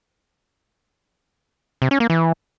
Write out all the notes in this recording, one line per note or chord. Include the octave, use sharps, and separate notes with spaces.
C3
C#4
A#3
E3